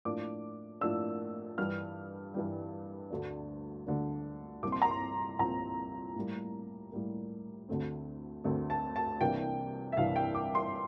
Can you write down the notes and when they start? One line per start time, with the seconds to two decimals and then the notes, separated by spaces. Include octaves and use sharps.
0.05 A2 F3 A#3 D4 D6
0.81 A2 F3 A#3 D4 E6
1.58 G2 E3 G3 F6
2.34 G2 E3 G3
3.10 D2 D3 A3 D4
3.87 D2 D3 A3 D4
4.63 C2 A#2 F3 C4 D6
4.72 C6
4.82 A#5
4.91 C6
5.39 C2 A#2 F3 C4 A#5
6.15 A2 G3 A#3
6.92 A2 G3 A#3
7.69 D2 D3 A3 C4
8.44 D2 D3 A3 C4
8.70 A5
8.96 A5
9.21 C2 C3 E3 A#3 D4 G5
9.92 E5
9.97 C2 C3 E3 A#3 D4 F5
10.16 G5
10.35 D6
10.55 C6